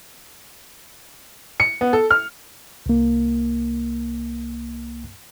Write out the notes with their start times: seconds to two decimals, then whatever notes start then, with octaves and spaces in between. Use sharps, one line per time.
1.60 C#7
1.81 B3
1.93 A4
2.10 F6
2.86 C2 A#3